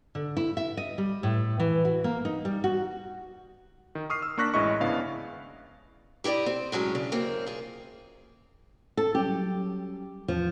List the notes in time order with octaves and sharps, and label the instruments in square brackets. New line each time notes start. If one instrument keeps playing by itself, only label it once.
[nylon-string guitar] D3
E4
E5
D#5
G3
A2
E3
F#4
A#3
D#4
G3
F#4
[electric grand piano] D#3
C#6 D#6 F6 C7
E6
A#3 D4 C#6 F#6 A#6 B6
A1 F#2 G#3 E4 D#5 C#6
G#1 C#3 B3 D4 E4 F5
[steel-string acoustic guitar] E4 G4 A#4 D5 D#5
C4
A2 F#3 G#3 C#4
C#3 D4
F#2 A#3 C4
F4 G#4
[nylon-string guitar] A4
[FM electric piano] F#3 G3 C#4 [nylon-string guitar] G4
[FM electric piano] E2 [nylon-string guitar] F3